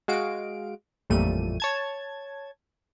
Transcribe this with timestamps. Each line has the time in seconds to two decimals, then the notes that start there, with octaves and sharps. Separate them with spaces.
0.08 G#3 F#4 F5 D7
1.10 A1 F2 A#2 G3 A3 D#7
1.60 C#5 A5 G#6